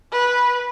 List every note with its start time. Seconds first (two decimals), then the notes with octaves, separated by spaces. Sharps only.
0.12 B4